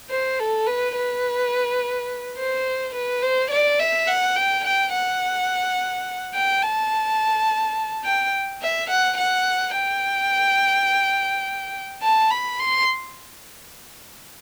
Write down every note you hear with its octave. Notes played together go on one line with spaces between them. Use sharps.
C5
A4
B4
B4
C5
B4
C5
D5
E5
F#5
G5
G5
F#5
G5
A5
G5
E5
F#5
F#5
G5
A5
B5
C6